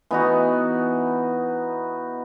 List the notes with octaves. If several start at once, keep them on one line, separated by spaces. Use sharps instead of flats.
E3 B3 D#4 F#4